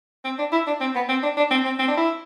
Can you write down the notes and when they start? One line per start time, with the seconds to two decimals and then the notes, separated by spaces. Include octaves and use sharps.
0.24 C4
0.39 D4
0.52 E4
0.67 D4
0.81 C4
0.95 B3
1.09 C4
1.23 D4
1.37 D4
1.51 C4
1.65 C4
1.79 C4
1.88 D4
1.97 E4